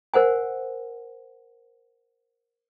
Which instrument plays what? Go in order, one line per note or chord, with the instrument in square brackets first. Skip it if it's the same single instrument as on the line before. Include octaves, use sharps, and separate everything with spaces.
[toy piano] A#4 C5 F#5 G#5